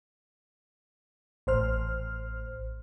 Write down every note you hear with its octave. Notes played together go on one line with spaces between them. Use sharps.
A1 C5 F6